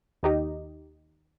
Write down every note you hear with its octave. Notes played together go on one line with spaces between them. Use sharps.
D#2 D#4 G4 D#5